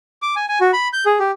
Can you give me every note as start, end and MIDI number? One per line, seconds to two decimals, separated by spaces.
0.22 0.35 86
0.36 0.46 80
0.48 0.59 80
0.61 0.71 66
0.73 0.88 83
0.93 1.04 91
1.06 1.19 68
1.19 1.31 67